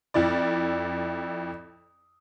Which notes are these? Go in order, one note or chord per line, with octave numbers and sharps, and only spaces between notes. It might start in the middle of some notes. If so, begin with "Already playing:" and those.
F2 E4 D5